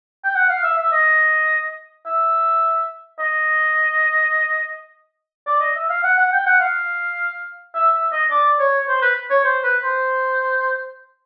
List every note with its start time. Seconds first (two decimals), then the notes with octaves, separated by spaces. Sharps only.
0.24 G5
0.35 F#5
0.49 F5
0.64 E5
0.77 E5
0.92 D#5
2.06 E5
3.19 D#5
5.46 D5
5.60 D#5
5.75 E5
5.89 F5
6.04 F#5
6.18 F#5
6.32 G5
6.46 F#5
6.60 F5
7.74 E5
7.93 E5
8.12 D#5
8.31 D5
8.59 C#5
8.88 C5
9.02 B4
9.30 C#5
9.44 C5
9.63 B4
9.83 C5